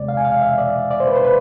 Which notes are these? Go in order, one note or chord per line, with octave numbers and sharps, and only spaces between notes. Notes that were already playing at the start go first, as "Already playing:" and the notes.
Already playing: E2 C3 G#3 D5
F5
G#5
F5
E5
D5
D5
C5
B4
C5
B4